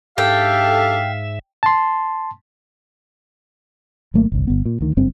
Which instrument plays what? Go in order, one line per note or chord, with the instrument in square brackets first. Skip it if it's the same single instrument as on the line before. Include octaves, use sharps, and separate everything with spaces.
[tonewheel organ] G#2 E5 [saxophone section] D4 G4 A4 [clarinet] F5 [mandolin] G5
[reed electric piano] A5 C6
[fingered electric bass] G#1 F#3 A3 A#3
G1 C2
G1 B3
A#2
D2 D#3
F#1 G2 C4